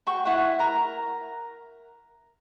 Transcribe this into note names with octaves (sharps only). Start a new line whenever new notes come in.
F#4 G5 C#6
E4 B4 F#5
A#4 A#5